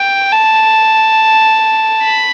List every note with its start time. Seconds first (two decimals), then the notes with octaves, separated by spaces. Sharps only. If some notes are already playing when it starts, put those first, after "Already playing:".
Already playing: G5
0.32 A5
2.02 B5